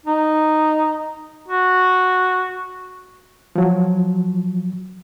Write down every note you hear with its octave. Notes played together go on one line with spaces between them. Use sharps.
D#4
F#4
F3 F#3